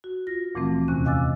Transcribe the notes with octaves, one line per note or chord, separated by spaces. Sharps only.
F#4
F4 A#6
D2 A#2 E3 F3 A3 C4
E2 C3 C#4 F#6
D#5 F5 G#5 D6 E6 A6